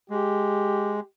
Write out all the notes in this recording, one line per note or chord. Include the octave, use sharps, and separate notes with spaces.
G#3 G4